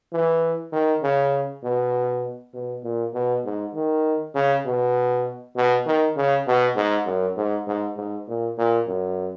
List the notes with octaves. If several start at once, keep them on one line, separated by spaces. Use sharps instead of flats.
E3
D#3
C#3
B2
B2
A#2
B2
G#2
D#3
C#3
B2
B2
D#3
C#3
B2
G#2
F#2
G#2
G#2
G#2
A#2
A#2
F#2